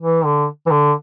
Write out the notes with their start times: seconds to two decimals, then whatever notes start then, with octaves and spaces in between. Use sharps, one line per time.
0.01 E3
0.25 D3
0.66 E3
0.71 D3